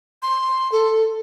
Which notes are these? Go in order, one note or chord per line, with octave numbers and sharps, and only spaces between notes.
C6
A4